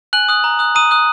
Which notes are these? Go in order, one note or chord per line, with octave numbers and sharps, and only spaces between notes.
G#5 F#6 F#7
D#6 F#6
A#5
D#6 F#6
A#5 D#6 D#7
D#6 F#6